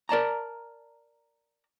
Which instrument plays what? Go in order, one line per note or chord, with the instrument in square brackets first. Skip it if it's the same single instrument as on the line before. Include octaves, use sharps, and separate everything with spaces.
[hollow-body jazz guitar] A#4 D5 A5 A#5